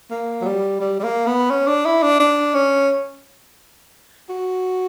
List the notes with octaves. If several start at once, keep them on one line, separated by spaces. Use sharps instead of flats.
A#3
F#3
G3
G3
G3
A#3
B3
C#4
D4
E4
D4
D4
C#4
F#4